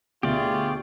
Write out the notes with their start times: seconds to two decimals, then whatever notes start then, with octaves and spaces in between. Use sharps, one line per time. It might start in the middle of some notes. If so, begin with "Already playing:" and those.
0.23 D2 B2 F4 G4 G#4 D5 E5 C#6